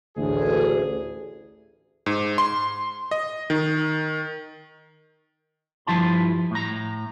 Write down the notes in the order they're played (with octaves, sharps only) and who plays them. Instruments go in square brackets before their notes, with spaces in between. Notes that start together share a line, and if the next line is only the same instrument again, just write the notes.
[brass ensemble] A1 D2 G#4
[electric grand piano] G#2
C6
D#5
D#3
[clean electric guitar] G2 F3 E4 A5 C6
A2 A#5